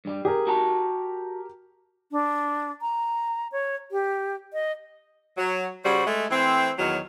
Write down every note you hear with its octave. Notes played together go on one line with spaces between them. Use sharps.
G2 G3
G4 G#4 A#4
F#4 A5 A#5
D4
A#5
C#5
G4
D#5
F#3
C#3 G3 F#4 C5
G#3 A3
E3 A3 C4
E2 D#3 F#3